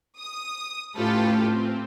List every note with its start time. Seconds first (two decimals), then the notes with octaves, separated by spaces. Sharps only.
0.17 D#6
0.96 A2 C#4 F4 G4 A4 B4
1.50 C4